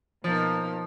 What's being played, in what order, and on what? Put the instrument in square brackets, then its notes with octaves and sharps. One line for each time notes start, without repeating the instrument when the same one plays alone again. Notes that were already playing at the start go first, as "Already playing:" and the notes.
[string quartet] B2 A#3 D#4 [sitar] F3